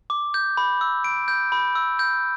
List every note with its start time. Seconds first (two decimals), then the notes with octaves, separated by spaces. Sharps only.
0.10 D6
0.34 G6
0.57 B5
0.81 E6
1.04 D7
1.28 G6
1.52 B5
1.75 E6
1.99 G6